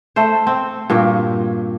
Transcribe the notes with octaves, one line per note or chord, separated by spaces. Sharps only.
A3 A4 C5
C4
G2 A#2 F#4 G4